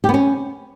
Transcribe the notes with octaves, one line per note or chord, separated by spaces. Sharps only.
G4
B3
C#4